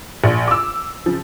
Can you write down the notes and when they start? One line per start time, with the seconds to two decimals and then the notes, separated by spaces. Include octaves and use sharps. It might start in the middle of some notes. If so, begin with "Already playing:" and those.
0.24 A#1
0.48 D6 E6
1.06 C#3 F3